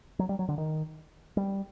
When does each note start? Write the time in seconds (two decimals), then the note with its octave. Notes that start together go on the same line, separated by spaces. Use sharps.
0.19 F#3
0.29 G3
0.39 F#3
0.49 D3
0.58 D#3
1.37 G3